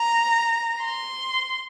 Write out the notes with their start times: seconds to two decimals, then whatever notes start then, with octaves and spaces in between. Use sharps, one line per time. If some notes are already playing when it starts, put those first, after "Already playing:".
Already playing: A#5
0.82 C6